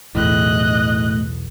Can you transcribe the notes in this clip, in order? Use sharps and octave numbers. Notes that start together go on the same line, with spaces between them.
B1 E2 A2 D#5 F#6